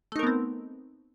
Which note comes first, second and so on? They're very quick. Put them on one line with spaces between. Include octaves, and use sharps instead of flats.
A3 D#4 A#4 B3 C4